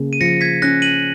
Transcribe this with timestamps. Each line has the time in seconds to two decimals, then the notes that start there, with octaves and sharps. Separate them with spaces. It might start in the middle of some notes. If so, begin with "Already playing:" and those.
Already playing: C#3 A#3
0.13 D#7
0.20 F3 A#6 C#7
0.41 G#6 B6
0.62 C#4 F#6 A#6
0.82 D#7 F#7